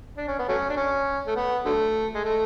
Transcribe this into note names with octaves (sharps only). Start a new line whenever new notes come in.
D4
C#4
B3
F#3 A3 C#4
D4
C#4
A3
B3
D3 F#3 A3
G#3
A3